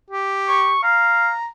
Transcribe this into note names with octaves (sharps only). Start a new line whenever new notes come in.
G4
C#6
F5 A#5